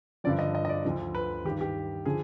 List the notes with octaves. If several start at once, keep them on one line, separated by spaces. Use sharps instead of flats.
G2 D3 F3 D5
D#5
D#5
D#5
D5
D2 D3 F3
B4
G2 D#3 G4
G4
D3 F3 G#4